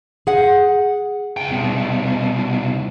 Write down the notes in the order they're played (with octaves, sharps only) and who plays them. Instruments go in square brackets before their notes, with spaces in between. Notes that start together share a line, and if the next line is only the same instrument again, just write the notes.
[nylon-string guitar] G#4 F#5
[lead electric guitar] C#2 G5
C2 B2